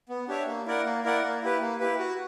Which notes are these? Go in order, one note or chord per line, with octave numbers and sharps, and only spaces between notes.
B3
D4 G4 C#5 E5
A#3
E4 A#4 D5 F#5
A#3
E4 A#4 D5 F#5
A#3
E4 G4 B4
A#3
E4 G4 B4
F#4